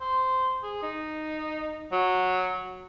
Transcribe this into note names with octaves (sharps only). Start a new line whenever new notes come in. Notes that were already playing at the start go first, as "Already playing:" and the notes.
C5
G#4
D#4
F#3